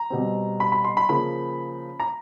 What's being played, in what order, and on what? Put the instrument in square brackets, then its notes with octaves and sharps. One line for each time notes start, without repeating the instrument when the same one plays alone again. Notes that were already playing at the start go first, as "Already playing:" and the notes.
Already playing: [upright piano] A#5
B2 G3 C4
B5
B5
C6
B5
C#3 F3 A#3 B5
A#5